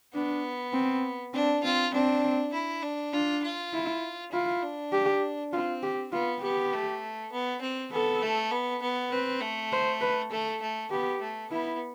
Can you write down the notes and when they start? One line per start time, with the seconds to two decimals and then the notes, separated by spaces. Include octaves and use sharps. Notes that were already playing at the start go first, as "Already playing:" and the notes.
0.14 B3 D4
0.73 C4
1.33 C4 D4
1.63 C4 F4
1.93 C4 D4
2.53 E4
2.83 D4
3.13 D4 F4
3.43 F4
3.73 E4
4.32 E4 F4
4.62 D4
4.92 G4
5.53 C4 F4
5.83 G4
6.12 B3 F4
6.42 B3 G4
6.73 A3
7.32 B3
7.61 C4
7.92 B3 A4
8.22 A3
8.51 B3
8.82 B3
9.11 C4 B4
9.41 A3
9.72 C5
10.01 B4
10.31 A3 A4
10.62 A3
10.91 B3 G4
11.21 A3
11.50 B3 E4